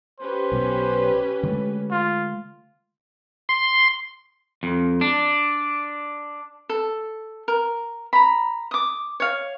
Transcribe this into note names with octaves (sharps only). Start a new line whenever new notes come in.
C#4 G4 B4 C5
B1 B2
D3 G#3 A3
F4
C6
F2
D4
A4
A#4
A#5 B5
D6 D#6
C#5 F5